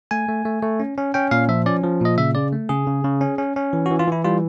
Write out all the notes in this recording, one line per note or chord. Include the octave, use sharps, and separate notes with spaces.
A3 G#5
A3
A3
A3
C#4
C#4
C#4 G5
A#2 F5
F3 E5
C#4 D5
F3
A#2 D#5
C#3 E5
C#3 D5
A3
C#3 G#4
C#3
C#3
C#4
C#4
C#4
E3
F#4
E3
F4
E3 E4
G3 F4